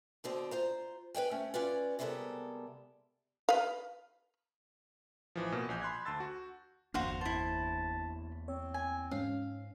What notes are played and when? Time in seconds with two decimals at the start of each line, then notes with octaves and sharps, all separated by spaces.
0.24 B2 D3 C4
0.51 F4 C5 A#5
1.14 B4 D5 G5 G#5
1.31 A3 C4 C#4
1.54 C#4 F4 B4 D5
1.99 C3 G3 G#3 B3 A4 A#4
3.49 B4 F5
5.35 A1 E3 F3
5.52 B2 A#3
5.69 A#1 G#5 G6
5.82 B5 C6 F#6 G#6
6.05 D2 A5 C6 E6 A6
6.20 F#4
6.94 G1 E2 A#3 D4 F#4 C5 F5
7.21 E4 C5 A5
8.48 C4 C#5
8.74 G#5
9.11 G#2 C#4 F5